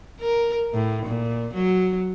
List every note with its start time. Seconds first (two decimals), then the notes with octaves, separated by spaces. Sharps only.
0.20 A#4
0.74 A2
1.06 A#2
1.54 F#3